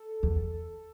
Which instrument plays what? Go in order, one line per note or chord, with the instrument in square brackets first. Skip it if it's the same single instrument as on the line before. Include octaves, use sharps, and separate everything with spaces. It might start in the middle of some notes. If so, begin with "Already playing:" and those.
Already playing: [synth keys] A4
[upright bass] E2